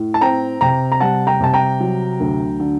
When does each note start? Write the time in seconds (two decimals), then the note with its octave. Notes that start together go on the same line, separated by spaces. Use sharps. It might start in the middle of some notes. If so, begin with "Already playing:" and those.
Already playing: A2
0.14 A5
0.21 C4 G5 A#5
0.61 C3 G5 A#5
0.92 A#5
1.00 G3 F#5 A5
1.27 G5 A#5
1.41 C3 A5
1.54 G5 A#5
1.80 F#3
2.20 D2
2.60 D3